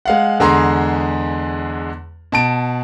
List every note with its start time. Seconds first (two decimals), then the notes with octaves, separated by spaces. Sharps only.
0.06 G#3 F5 F#5
0.40 E2 D3 G#3 G#4 A#5 C6
2.32 B2 A5 D7